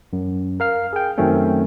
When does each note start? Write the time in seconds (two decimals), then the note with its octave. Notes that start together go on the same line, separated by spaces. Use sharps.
0.13 F#2
0.60 A#4 F5 F6
0.93 G#4 G5
1.18 F#2 D#3 F#3 A3 C4 C#4